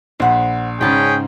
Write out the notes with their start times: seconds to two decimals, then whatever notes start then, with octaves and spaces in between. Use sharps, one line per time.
0.20 A#1 C5 F#5 B5
0.81 G#2 C#3 C#4 G#4 D5 G5 A5 B5